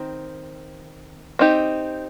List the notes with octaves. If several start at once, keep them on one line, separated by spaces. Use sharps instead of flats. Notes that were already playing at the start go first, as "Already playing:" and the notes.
Already playing: D#3 C4
C4 D#4 G4